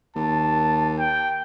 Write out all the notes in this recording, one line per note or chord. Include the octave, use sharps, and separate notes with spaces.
D#2 A5
G5